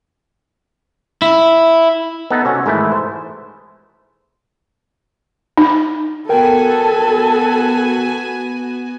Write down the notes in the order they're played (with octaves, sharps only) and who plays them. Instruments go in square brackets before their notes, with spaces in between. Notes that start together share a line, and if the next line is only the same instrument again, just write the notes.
[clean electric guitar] E4
[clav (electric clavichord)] B3 D#4 A4
C3 C#4 F#4
G#2 D#3 E3 A3 E4
C5
[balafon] D#4
[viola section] B3 F#4 G#5 [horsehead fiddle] A4 [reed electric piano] A#4 G5